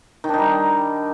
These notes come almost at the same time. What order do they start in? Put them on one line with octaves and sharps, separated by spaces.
D#3 D4 D#4 G3